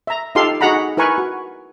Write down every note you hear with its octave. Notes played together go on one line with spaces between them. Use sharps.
E5 A#5
D#4 F4 G4 A4 F5 C6
D#4 F#4 G#4 F#5 A#5 B5
E4 A#4 B4 G#5 C#6
F#4